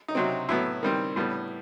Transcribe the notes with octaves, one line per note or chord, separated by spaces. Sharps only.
D#4
C3 F#3 C4
A2 F#3 B3 E4
D#3 G3 C4
A2 G3 B3